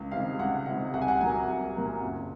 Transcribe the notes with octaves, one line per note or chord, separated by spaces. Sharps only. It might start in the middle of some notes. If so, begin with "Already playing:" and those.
Already playing: C#2
C3 D#3 G#3 F5
C#2 F#5
C3 D#3 G#3 F#5
C2 F#5
G#5
F#5
A#2 F#3 A#3 G#5
C2
A#2 F#3 A#3
F#1